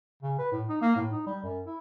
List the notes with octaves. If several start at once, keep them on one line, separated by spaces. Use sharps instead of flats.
C#3
B4
A2
D#4
A#3
A2
D#4
G3
F#2
E4